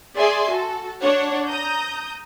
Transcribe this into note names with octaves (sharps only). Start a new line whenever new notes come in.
G#4 D5 E5 G#5 C6
F#4 A4
D4 C#5 F#5
A#5 D#6 G6